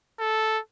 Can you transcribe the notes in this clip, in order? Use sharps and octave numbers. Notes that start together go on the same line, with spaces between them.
A4